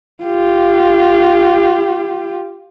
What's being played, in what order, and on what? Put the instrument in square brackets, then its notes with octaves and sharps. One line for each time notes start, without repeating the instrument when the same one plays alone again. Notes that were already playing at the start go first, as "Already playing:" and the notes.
[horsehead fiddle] F4 G4